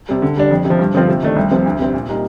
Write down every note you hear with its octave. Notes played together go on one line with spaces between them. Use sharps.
C3 G3
D3
G3 D4
F2
C3
F3
G2
D3 F3 C4 F4
C3
D#3 A3 D4
C2
C3 F3 C4
D2
C3 G3 C4
A#2
G3 A#3 D#4